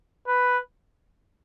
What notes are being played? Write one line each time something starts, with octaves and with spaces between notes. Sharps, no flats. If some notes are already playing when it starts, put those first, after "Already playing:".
B4